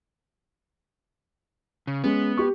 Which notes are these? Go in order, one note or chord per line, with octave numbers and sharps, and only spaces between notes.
C#3
G#3 B3 C#4
G4 C#6